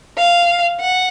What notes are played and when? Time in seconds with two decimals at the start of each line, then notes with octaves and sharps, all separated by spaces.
0.18 F5
0.80 F#5